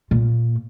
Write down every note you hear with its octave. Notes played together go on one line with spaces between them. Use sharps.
A#2